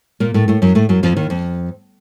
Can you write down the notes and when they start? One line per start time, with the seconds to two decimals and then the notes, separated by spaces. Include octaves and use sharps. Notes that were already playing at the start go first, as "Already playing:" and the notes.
0.20 A#2 A#3
0.34 A2 A3
0.48 A2 A3
0.62 F#2 F#3
0.75 A2 A3
0.89 F#2 F#3
1.03 F2 F3
1.17 D#2 D#3
1.30 F2